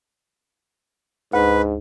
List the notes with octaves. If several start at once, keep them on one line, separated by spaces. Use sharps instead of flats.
D2 G#2 B4